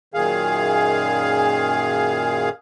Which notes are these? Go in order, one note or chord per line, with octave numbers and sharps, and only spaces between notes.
F#2 A#2 D#3 G#4 F5